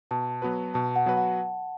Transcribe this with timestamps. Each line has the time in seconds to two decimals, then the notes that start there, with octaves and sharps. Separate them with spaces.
0.11 B2 A5
0.42 F#3 B3 F#4 B4
0.74 B2 A5
0.96 F#5
1.06 F#3 B3 F#4 B4
1.17 F#5